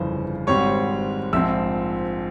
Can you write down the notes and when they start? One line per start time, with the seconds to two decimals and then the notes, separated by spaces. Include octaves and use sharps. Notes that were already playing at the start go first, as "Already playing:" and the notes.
Already playing: G1 F2 C#3 E3 C5
0.47 G#1 G#2 G3 C4 C#5 C#6
1.33 A#1 G#2 F3 C4 E5 E6